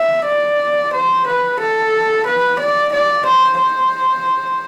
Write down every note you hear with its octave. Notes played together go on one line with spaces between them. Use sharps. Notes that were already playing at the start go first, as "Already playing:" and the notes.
Already playing: E5
D5
C5
B4
A4
B4
D5
D5
C5
C5